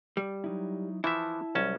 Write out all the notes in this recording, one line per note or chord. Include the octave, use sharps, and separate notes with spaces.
G3
F#3 D#4 E4
E3 F3 E4 E5 A5
C2 F#3 G3 C#4 A5